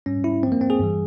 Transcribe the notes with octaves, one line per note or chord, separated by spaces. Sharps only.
G#2 G3 C#4
E4
G2 F3 C4
A#3
C4
G#4
G2 E3 G3